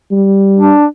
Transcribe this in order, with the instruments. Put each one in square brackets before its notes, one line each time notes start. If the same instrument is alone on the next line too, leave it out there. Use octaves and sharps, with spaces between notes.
[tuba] G3
[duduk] D4